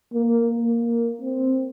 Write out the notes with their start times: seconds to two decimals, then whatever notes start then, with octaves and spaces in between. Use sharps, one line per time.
0.14 A#3
0.50 A#3
1.22 C4